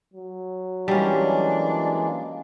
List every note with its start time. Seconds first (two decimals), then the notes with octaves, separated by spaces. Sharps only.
0.13 F#3
0.88 E3 G3 G#3 A#3 C#4 D4